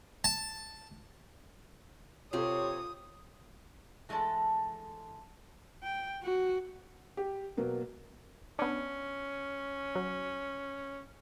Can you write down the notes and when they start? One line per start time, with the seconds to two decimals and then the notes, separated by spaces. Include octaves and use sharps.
0.24 A5
2.33 C3 C4 F4 G4 A4 C#5 D#6
4.09 E3 G#3 A3 D4 A4
5.83 G5
6.23 F#4
7.17 G4
7.57 B2 F#3 A#3
8.59 B3 C#4 D4
9.95 F#3